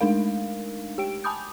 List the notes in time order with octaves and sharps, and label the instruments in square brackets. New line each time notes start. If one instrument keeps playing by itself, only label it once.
[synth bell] G#3 A3 D4 D#4 A#4 F5
G4 G5 D7
G#5 A5 B5 D6 D#6 G6